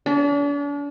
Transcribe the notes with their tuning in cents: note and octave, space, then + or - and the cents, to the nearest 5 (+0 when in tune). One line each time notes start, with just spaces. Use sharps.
D4 -40